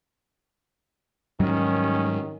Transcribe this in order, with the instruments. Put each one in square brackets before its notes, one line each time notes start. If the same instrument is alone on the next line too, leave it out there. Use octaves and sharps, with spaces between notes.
[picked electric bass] G#2 F#3 G3 [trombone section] D#3 C#4